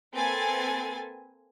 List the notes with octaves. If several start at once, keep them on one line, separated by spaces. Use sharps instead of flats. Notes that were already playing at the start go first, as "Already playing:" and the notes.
A#3 C4 A4 B4 G#5 A6